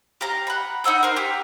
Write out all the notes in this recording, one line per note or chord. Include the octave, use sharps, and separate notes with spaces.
G4 F5 A#5
F#5 B5
D#4 F#5 E6 G6
A#4 C5
G4